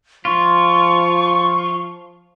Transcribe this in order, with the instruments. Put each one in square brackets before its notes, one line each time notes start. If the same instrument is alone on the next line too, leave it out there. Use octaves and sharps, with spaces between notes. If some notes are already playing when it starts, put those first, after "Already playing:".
[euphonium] F3 [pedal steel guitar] F4 [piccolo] C#6